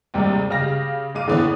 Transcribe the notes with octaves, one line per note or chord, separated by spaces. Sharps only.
D#2 C3 G3 G#3
C#3 G4 F5 A#6
G#2 G#3 F5 D6 D#7
D#2 D3 E3 B3 C#5